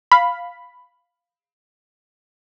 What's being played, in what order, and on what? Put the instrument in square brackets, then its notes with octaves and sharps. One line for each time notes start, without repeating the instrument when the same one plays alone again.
[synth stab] F5 B5